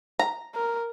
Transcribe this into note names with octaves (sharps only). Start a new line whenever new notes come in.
A#5
A#4